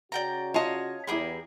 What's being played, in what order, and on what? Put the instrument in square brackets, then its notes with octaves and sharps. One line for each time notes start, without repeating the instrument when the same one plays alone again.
[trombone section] C#3 C#4 F#4 [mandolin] D5 G5 A#5
[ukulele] F4 F5 A5 [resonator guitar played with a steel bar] C#5 D#5
[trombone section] E2 [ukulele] E4 B5 [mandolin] G4 G#4 A#4